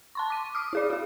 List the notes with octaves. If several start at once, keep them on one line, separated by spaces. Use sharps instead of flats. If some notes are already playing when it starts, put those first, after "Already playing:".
A5 C6 C#6
D6 D#7
D6 D#6 F6
E4 G#4 D5
F#4 G#4